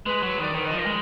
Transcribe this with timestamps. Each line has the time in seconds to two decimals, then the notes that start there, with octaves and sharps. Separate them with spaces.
0.06 G#3 B4
0.23 F#3
0.38 D#3 D5
0.54 D#3 B4
0.66 F3 D#5
0.78 A#4
0.86 G#3